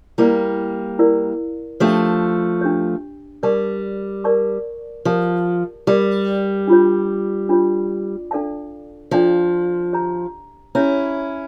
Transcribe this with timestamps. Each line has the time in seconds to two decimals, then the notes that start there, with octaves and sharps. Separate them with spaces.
0.18 G3 A#3 E4 A#4 D5 F5
0.99 E4 A#4 D5 F5
1.80 F3 A3 D4 G4 C#5
2.61 D4 G4 C#5
3.43 G3 A#4 D5 A5 C#6
4.24 A#4 D5 A5 C#6
5.05 F3 G4 A#4 D5
5.87 G3 G4 A#4 D5
6.67 D4 F4 C#5
7.49 D4 F4 C#5
8.31 D4 A4 D5 F5 A5
9.11 F3 D4 A4 D5 F5 A5
9.93 G4 C#5 E5 A#5
10.75 C#4 E4 G4 C#5 E5 A#5